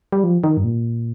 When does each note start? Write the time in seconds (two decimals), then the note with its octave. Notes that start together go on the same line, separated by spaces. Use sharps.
0.12 G3
0.24 F3
0.44 D#3
0.57 G2
0.64 A#2